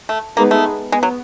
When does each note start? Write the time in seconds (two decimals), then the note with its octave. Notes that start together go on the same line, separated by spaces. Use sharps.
0.09 A3
0.36 G#3 A#3 B3 D#4 G#4 B4
0.51 A3
0.92 G#3 B3
1.03 F#3